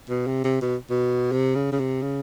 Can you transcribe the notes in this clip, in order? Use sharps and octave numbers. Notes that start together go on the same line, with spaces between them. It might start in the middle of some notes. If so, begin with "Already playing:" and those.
B2
C3
C3
B2
B2
C3
C#3
C#3
C3
C#3